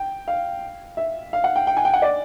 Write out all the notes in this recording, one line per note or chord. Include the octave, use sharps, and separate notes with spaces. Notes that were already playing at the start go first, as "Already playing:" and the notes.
Already playing: G5
F5
E5
F5
F#5
G5
G5
G#5
G5
F#5
D5